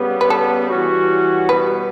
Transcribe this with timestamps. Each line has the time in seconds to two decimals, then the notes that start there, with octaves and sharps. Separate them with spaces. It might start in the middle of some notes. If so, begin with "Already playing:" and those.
Already playing: C#3 G3 B3
0.21 B4
0.30 A4
0.70 E3 G3 C#4 F#4
1.49 B2 G3 B3 B4